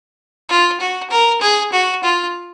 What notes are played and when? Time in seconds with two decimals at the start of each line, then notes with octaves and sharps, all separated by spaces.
0.49 F4
0.81 F#4
1.10 A#4
1.41 G#4
1.73 F#4
2.03 F4